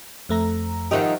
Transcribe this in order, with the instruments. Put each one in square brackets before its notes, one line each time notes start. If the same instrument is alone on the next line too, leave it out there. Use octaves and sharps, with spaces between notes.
[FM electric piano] F2 A3 A#5
[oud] D#3 F3 D#4 [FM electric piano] G4 E5 F#5